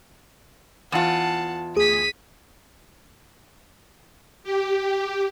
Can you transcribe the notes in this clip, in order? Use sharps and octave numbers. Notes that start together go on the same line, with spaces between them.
E2 F4 F#5 A5
D2 G#4 B6 D#7
G4